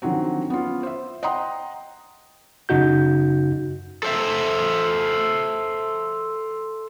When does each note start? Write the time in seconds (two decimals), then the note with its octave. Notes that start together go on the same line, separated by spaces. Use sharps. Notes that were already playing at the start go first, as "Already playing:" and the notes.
0.02 D3 D#3 F3 F#3 C4
0.50 B3 C#4 F4
0.83 C5 E5
1.23 D#5 F#5 G5 A#5 C6 D#6
2.69 F#2 C#3 D#4 F#4 G6
4.03 A4 C5 E5